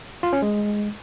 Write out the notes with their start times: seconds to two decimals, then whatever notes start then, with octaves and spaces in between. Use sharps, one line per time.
0.23 F4
0.33 C#4
0.42 G#3